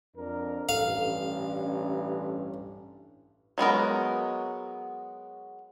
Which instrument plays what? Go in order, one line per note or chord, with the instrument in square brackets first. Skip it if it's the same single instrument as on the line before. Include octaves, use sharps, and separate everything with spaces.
[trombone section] F2 D4 A#4
[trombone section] A1 G2 [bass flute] A4 [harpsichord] F5
[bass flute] C#4
[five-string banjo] F#3 G#3 B3 A#4